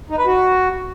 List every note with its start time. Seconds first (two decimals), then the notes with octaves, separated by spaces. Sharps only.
0.10 D#4
0.18 B4
0.26 F#4